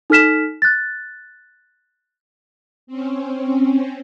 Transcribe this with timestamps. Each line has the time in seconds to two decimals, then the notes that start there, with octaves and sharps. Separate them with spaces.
0.10 D#4 A4 F6 B6 E7
0.62 F#6 A6
2.87 C4 C#4